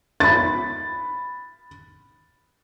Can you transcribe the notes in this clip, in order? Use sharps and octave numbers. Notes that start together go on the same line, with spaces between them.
B5 A6